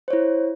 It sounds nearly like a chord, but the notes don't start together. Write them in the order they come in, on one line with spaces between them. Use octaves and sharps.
C5 C#5 E4